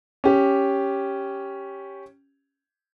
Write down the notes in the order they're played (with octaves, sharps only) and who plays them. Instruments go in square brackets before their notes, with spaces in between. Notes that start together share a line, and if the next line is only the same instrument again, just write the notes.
[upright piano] C#4 G4